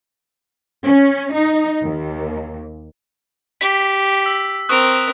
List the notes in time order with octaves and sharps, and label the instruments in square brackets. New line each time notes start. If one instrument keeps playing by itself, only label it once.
[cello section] C#4
D#4
D#2
[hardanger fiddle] G4 [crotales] B6
[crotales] E6
[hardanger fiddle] C4 A#4 [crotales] C#6 D#6 F#6